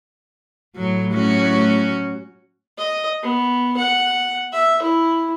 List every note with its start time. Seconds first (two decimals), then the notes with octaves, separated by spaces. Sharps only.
0.76 A2 F#3
1.14 F#3 C#4 F#4
2.78 D#5
3.23 B3
3.77 F#5
4.52 E5
4.82 E4